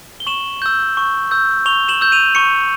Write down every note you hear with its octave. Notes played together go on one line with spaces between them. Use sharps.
G7
C#6 E7 F#7
E6 G6
C#6
E6 G6
C#6 F7 G7
E7 F#7
E6 G6
D#7 F7
C#6 C#7 D#7